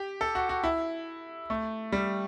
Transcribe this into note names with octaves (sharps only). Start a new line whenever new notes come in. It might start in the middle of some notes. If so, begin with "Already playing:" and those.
Already playing: G4
A4
F#4
F#4
E4
A3
G3